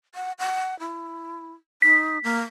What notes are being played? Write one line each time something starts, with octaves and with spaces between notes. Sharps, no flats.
F#5
F#5
E4
D#4 B6
A#3